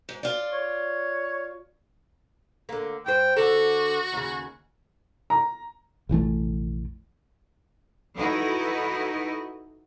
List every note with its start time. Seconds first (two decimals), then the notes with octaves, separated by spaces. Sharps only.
0.09 G#2
0.23 F4 D5
0.53 C#5
2.69 D3 A#3
3.06 G2 C5 G5
3.36 D3 F#4 A4
4.12 D#2 C#3
5.30 A#5
6.09 F1 A#1 E3 A3
8.17 D#4 E4 F#4 A4 B4 D#5